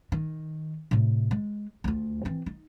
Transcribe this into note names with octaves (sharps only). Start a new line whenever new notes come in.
D#3
A2 C3
G#3
D2 F4
E3 C4
D#4